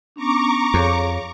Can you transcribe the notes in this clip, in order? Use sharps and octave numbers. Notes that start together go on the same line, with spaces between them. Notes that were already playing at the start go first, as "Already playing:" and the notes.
B3 C#4 D4 A#5 C#6 D6
F2 G#4 C#5 F5